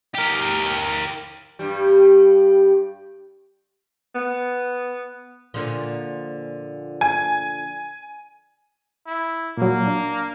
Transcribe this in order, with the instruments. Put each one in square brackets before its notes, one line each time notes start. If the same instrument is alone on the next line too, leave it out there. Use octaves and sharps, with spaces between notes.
[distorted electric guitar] G4 A#4
[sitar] G2 G3
[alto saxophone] B3
[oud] A#2 D3 F3
[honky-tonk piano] G#5
[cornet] E4
[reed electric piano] A#2 F#3 [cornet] A#3
[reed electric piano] D4